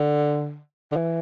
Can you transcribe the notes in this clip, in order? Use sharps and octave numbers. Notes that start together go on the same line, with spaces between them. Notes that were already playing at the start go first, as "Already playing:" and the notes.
Already playing: D3
D3
E3